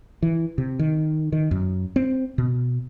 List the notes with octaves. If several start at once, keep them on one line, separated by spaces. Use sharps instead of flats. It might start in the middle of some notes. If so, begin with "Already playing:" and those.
E3
C3
D#3
D#3
F#2
C4
B2